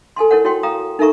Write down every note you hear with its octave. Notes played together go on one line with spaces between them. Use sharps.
A4 G#5 A5 C6
E4 A#4 C#5 F#5
E4 F#4 C#5 G5 C6
F5 G5 A#5 D#6
D#4 A4 A#4 E5 A#5 C#6